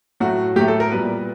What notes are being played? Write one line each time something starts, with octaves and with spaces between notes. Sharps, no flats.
A2 F#3 A3 F#4
A2 F#3 A3 G4
A4
A#4
A#2 G3 B3 B4